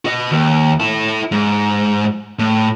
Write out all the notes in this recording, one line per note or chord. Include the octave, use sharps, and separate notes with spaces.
F#4 D#5
D#2
E4 A4
G#2
A2